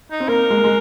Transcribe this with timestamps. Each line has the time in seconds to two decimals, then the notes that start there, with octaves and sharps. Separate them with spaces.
0.11 D#4
0.20 C4
0.28 A#3 A#4
0.50 G#3
0.57 A#3
0.64 G#3